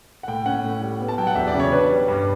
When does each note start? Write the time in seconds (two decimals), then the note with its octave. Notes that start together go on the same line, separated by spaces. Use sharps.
0.23 F#5
0.28 A2 G5
0.46 C#4 F#5
0.64 A2
0.82 G3
1.00 B3
1.08 A5
1.18 F#3 G5
1.27 F#5
1.35 E2 E5
1.48 D5
1.54 C#3
1.60 C#5
1.72 D4 B4
1.89 G3
2.08 G2